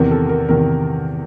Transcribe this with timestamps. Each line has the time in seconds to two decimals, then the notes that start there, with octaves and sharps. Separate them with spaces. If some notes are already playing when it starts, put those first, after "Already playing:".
Already playing: E2 C3 D#3 A#4
0.11 A4
0.29 A#4
0.49 E2 C3 D#3 A#4